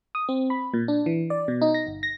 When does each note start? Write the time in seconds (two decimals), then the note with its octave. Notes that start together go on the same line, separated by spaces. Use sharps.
0.15 D#6
0.29 C4
0.50 B5
0.74 A#2
0.88 D4
1.06 E3
1.30 D5
1.48 B2
1.62 D#4
1.74 A#6
1.87 G1
2.03 A#6